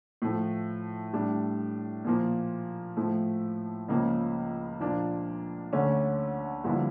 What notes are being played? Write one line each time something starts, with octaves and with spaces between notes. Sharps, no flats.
A2 F3 A3
A2 G3 D4
A#2 F3 A#3
A2 F3 A3 E4
C#2 C#3 F3 A#3
A#2 F3 A#3 D4
D2 D3 A3 C#4
G2 D3 F3 A#3 E4